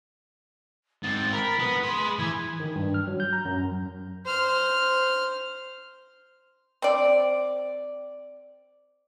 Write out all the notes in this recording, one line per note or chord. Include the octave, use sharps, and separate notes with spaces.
G#2 C4 A6
A#4 B5
B3
G#4 C6
E3 G#6
D#3
G2
F6
F#3
G6
A#5
F#2
C5 F6
C4 D5